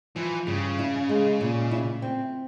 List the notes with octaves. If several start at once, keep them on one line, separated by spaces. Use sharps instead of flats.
E3 F3
G2 C#3
E4
G#3
A#2
E4
C4